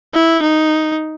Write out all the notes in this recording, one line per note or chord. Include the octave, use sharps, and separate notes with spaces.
E4
D#4